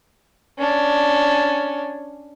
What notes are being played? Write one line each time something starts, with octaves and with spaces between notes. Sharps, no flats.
C#4 D4